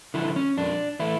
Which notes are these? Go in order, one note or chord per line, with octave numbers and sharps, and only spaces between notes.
D3 F3 E4
C#4
F2 D4
E3 A3 E4